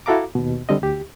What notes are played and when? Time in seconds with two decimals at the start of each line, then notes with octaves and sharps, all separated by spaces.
0.06 E4 F#4 A4 F5 A#5 D6
0.35 D#2 B2
0.69 D3 G3 C4 D#5
0.82 D2 G4